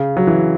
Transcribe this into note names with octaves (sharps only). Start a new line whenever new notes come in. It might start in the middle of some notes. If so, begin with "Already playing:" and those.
Already playing: C#3
F#3
E3